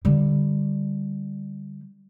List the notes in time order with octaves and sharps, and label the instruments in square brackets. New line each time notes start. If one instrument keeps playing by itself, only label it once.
[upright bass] D3 G3